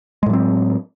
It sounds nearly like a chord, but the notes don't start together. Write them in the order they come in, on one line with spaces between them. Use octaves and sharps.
G#3 A2 F#3 C4